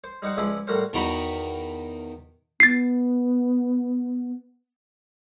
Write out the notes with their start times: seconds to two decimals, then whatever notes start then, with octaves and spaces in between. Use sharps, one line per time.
0.04 C5
0.22 G3 D#4 C5 F#5
0.37 C#2 F3 G#3 E4 D5 B5
0.67 A2 G3 F#4 A#4 C5
0.93 E2 D#3 D#4 F#4 A#5 B5
2.60 B3 A6 C7